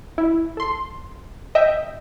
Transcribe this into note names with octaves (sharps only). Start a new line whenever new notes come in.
E4
A4 C6
D#5 E5 G5